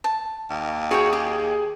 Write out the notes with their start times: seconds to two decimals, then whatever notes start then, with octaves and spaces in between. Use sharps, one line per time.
0.04 A5
0.51 D#2
0.91 F#4 G#4 C#5 G5
1.13 G4